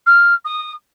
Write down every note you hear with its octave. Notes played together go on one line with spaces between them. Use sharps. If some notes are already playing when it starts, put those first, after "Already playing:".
F6
D#6